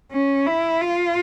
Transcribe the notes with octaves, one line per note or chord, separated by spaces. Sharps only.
C#4
E4
F4